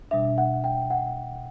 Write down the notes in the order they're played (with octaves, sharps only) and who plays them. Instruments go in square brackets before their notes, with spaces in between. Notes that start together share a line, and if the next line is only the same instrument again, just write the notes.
[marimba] B2 G3 D4 [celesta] E5
[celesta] F#5
G5
F#5